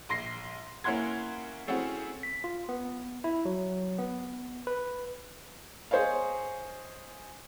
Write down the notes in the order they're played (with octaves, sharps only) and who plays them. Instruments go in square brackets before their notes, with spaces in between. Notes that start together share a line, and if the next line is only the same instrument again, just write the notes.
[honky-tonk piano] A#1 C6 A#6 C7
A#3 C#4 E4 F#5 C6 G#6
A3 C4 C#4 E4 F#4 G#4
[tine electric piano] B6
F4
B3
E4
F#3
B3
B4
[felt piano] G#4 C5 C#5 D#5 F5